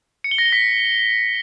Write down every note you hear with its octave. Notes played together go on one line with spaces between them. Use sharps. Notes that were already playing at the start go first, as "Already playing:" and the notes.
C#7
G7
A#6
G7
B6